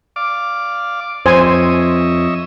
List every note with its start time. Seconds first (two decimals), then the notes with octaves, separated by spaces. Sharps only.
0.16 D5 F5 D6
1.26 F2 C5 C#5 D#5 E5 G#5